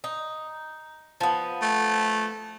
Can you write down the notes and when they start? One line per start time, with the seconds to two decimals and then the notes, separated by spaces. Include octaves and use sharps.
0.04 D#4
1.20 F3 B3
1.62 A3